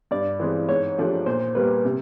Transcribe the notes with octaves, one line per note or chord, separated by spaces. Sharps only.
G2 D5
E3 G#3 C4
G#2 C#5
F3 A3 D4 G4
A#2 C5
G3 A#3 B4
C3